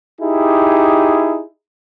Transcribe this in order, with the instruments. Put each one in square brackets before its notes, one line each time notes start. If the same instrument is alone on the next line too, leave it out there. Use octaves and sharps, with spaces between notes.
[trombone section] D#4 E4 G4 G#4